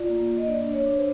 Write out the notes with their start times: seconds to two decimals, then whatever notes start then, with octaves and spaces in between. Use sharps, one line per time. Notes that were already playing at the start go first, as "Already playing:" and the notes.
Already playing: F4 D5
0.09 A#3
0.29 A#3
0.38 D#5
0.47 D4 D5
0.66 D4
0.73 C#5
0.86 D4
0.98 C5